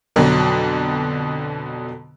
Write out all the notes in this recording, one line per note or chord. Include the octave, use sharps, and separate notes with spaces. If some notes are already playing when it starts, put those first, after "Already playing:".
F2 B2 D3 F#3